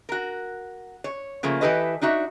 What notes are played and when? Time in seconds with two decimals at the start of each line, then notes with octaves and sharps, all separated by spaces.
0.09 F#4 A#4
1.04 C#5
1.43 C#3 F3 A3 A#3
1.61 E3 E4 G4 A4 B4 D#5
2.01 D4 D#4 F#4 E5